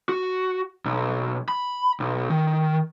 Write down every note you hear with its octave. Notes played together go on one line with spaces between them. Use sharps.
F#4
B1
B5
B1
D#3